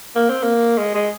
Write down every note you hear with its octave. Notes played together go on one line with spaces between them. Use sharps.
A#3
C4
A#3
G#3
G#3